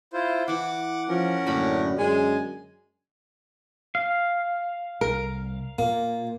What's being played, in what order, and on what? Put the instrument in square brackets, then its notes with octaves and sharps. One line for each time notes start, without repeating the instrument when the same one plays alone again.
[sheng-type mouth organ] E4 F4 C5
[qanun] E3 E4 [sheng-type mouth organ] F#5 D6
[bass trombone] F3 [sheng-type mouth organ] C#4 A#4 F#5
[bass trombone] F#2 [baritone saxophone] A2 [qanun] D3 A#3 B5
[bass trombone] F#2 [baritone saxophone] G#3 [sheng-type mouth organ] G#5
[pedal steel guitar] F5
[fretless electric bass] C2 [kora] A#4
[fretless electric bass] A#2 [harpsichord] A#3